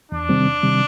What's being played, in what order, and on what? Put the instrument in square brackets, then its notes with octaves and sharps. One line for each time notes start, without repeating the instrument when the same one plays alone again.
[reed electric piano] E2 [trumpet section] D4
[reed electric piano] C3 D#3 G3 C4
E2
C3 D#3 G3 C4